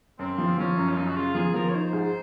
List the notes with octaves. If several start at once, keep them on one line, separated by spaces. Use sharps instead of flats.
F#2 C4
F3
F3 C#4
F#2
F4
F#2 D#4
F#4
C#3 F4
F3 G#4
F3 A#4
C#5
D#4 C5
G#2